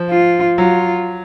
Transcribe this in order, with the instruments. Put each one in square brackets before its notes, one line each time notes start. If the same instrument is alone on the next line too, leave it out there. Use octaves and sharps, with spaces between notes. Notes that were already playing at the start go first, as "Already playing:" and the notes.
Already playing: [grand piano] F3
[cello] F4
[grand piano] F#3 [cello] F4